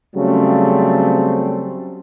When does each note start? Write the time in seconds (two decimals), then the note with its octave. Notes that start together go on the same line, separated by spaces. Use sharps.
0.16 C#3 F#3 G3 A3 C4